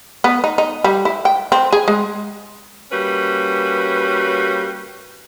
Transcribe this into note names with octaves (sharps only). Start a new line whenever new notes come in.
B3
D#4
D#4
G3
E4
G5
C4
G#4
G#3
G3 A#3 C#4 F#4 B4